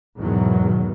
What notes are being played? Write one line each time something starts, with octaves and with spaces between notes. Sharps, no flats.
E2 G#2 B2 D#3 F#3